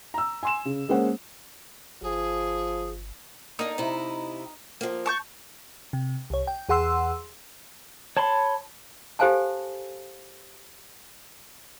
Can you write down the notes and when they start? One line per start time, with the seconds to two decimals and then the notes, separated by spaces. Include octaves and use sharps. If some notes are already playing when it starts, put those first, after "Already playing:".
0.14 A#5 E6
0.43 G#5 C6 E7
0.65 C#3
0.89 G#3 A#3 C#4 C5 F#5
2.02 G1 F3 G#4
3.59 A#3 D4 D#4
3.78 C3 E4
4.81 F3 A#3
5.06 A5 C#6 G6
5.93 C3
6.30 C2 C#5
6.47 G5
6.69 E2 G#4 F#5 C6 E6
8.17 C#5 A5 B5 C6
9.19 G4 A4 C5 F5 G#5 A5